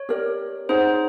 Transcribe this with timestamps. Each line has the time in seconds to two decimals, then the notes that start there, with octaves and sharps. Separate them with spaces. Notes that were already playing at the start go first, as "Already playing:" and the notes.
Already playing: C#5
0.09 G4 A#4 D5
0.69 D#4 G#4 C5 C#5 F#5